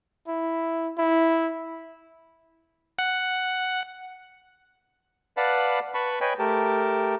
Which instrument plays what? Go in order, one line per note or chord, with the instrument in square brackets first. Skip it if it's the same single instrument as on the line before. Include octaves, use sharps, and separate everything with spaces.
[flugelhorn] E4
E4
[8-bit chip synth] F#5
[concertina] B4 D5 F5 F#5 A5 B5
B4 A5 B5 C#6
B4 C#5 D#5 G5 G#5 B5
A3 G4 A#4 A5